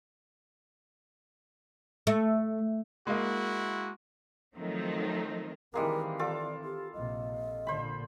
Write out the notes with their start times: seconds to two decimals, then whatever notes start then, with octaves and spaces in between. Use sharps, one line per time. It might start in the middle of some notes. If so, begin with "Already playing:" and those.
2.07 A3
3.07 G#3 A#3 E4 F#4
4.55 D#3 F3 F#3 A3 C4 D#4
5.74 D#3 E3 G3 G#3 A#3 C4 A#4
6.19 F4 A4 D5 D6
6.64 G4
6.94 A#1 C3 D#5
7.67 A#2 D3 C5 B5